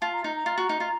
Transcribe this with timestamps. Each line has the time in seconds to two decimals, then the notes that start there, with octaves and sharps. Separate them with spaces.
0.01 F4 A5
0.13 A#5
0.24 D#4 A#5
0.35 A#5
0.46 F4
0.58 F#4
0.69 D#4
0.80 F4